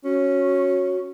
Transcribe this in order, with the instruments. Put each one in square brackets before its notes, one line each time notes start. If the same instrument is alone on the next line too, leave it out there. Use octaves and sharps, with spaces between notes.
[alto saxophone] C#4 [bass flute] F#4